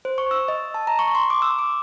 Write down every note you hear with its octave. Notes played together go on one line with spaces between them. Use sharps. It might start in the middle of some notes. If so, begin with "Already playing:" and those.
C5
C#6
E6
D#5
A5
A#5
C#6
C6
D6
E6
D6